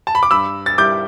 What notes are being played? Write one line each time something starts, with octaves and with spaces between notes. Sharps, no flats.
A5
B5
D6
G2 B5 E6
A6
G3 E4 D6 G6